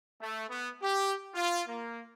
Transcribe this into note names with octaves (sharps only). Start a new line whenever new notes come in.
A3
B3
G4
F4
A#3